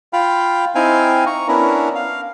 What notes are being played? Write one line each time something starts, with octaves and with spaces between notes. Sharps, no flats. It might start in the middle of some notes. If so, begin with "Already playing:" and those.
F4 F5 G5 B5
C4 D#4 E4 F5 G5 G#5
A#5 C#6
B3 C#4 D4 E4 A#4
F5